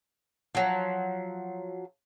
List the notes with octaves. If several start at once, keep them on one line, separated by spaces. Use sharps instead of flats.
F3 F#3